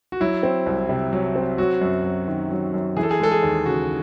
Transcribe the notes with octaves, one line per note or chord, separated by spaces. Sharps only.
F#4
F#3 E4
C4
C2
C3
F#3
C4
F#3 F#4
F#2
F#2
D#3
F#3
F#2
E3 G#4
A4
G#4
G#3 A4
G#4
D#2
C#3 F#4